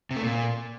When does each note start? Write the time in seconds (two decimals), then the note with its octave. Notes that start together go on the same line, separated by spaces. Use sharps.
0.11 C3
0.16 A3
0.22 A#2